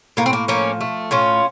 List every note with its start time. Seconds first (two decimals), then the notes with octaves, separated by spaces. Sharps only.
0.17 A2 A#3
0.26 C4
0.33 A#3
0.48 F3 A#3 C#4
0.81 A3
1.11 A2 C#4 F4